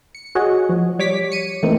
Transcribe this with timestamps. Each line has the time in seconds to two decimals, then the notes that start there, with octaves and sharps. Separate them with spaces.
0.15 C#7
0.35 F#4 G#4 C#5 D#5 F#5
0.69 F3
0.99 G3 C#5 D6 B6
1.32 C#7 D#7
1.63 E3 A3 A#3 C4 D#4